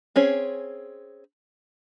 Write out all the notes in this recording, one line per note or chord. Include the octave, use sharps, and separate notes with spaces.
C4 C#4 G#4